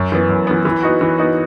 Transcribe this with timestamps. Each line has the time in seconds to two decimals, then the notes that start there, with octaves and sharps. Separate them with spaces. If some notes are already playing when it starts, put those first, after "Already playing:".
Already playing: F#2
0.12 E3 B3
0.29 F#2
0.47 E3 B3
0.65 E3
0.83 B3 D#4 F#4
1.01 E3
1.18 B3 D#4 F#4